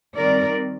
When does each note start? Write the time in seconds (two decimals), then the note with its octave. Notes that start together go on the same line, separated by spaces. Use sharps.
0.16 D#3 G3 C4 A#4 D5